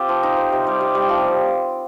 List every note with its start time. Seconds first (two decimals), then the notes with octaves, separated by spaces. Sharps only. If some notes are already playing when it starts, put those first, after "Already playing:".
Already playing: C4 F4 G4
0.09 F3
0.23 D#4
0.37 C4
0.52 C3
0.67 G3
0.81 G4
0.95 G3
1.09 F3